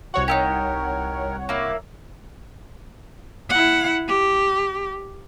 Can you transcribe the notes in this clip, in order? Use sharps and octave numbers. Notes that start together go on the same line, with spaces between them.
C2 F#4 C#5 F#5 C#6
D#4 E4 G4 A#4
A#3 E4 D6
E4 F#5
G4